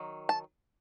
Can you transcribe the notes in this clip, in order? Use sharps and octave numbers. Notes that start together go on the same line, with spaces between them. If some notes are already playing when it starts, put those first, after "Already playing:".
Already playing: D#3 F#3
A5